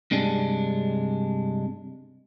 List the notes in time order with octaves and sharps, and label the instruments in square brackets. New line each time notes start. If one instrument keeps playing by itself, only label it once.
[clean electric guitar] G2 C3 G#3 D4